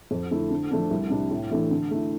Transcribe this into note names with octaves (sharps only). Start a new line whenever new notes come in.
F2
D3 A3 E4
D3
F3 A3 D4
C2
C3 G3 D4
A2
E3 A3 D4
D3
A3 E4